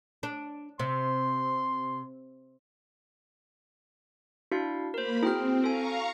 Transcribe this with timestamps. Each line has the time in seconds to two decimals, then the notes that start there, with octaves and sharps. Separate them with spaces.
0.23 D4
0.79 C3 C6
4.52 D4 E4 F#4 F5
4.94 A#3 A#4 C5 B5
5.23 C4 E4 F#4 G#4 G5 F6
5.64 A4 F5 G#5 A#5 C#6